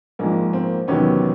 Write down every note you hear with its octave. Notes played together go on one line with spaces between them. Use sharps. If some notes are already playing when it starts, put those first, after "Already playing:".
A#1 G#2 F3 G#3 A#3
A#3 C4
E2 C3 D#3 F#3 B3 C#4